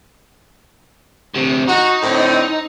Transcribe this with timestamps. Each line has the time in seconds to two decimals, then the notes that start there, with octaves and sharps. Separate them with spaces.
1.34 D2 C3
1.68 D#4 F#4
2.03 A2 D3 C4